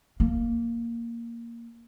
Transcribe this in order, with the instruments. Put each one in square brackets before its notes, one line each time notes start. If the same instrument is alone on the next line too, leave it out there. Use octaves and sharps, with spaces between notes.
[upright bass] A#3